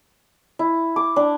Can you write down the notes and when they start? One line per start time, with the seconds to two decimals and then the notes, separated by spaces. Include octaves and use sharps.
0.59 E4
0.96 D6
1.16 D4